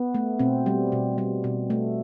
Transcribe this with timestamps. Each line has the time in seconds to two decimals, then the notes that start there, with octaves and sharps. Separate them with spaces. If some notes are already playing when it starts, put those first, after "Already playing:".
Already playing: B3
0.14 A3
0.39 B2 C4
0.66 G3
0.92 B2
1.18 G3
1.44 B2
1.70 A3